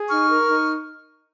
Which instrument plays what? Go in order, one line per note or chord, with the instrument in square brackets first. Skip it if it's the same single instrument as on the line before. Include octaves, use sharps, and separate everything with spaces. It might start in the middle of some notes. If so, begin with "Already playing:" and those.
Already playing: [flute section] G#4
D#4 C#6 F6
A#4
D#4